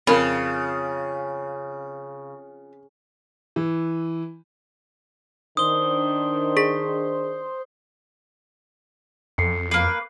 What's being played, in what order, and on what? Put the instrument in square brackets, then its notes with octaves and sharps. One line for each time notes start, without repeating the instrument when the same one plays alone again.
[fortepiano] F2 [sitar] C#3 [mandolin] F4 [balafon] A#4 B5
[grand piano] E3
[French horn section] D#3 D4 [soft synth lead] C5 [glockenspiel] D#6 G7
[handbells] G#4 B6
[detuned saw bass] F2 [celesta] A4 C7 C#7
[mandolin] A#3 B4 [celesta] C7